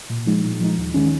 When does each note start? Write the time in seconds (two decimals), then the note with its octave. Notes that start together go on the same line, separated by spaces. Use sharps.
0.10 A#2
0.26 F3 G#3 D#4
0.44 A#2
0.60 F3 G#3 D#4
0.78 D#2
0.94 D#3 G#3 C#4